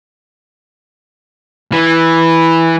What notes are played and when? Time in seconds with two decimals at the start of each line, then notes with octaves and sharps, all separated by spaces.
1.72 E3